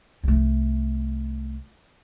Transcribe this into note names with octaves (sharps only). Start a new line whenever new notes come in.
C2 A3